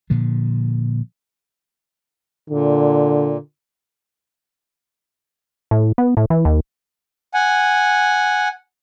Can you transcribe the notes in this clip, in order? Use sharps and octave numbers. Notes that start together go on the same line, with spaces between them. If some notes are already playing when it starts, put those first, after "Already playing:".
A#2 D3 F3
A#2 D3
A2
B3
A2
E3
D#2
F#5 G#5